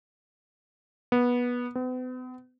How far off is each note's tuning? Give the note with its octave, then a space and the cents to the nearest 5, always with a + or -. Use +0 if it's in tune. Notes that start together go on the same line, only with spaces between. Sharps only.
B3 -15
B3 +45